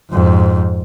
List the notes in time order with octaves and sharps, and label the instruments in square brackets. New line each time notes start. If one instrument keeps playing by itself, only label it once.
[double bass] F2 G#2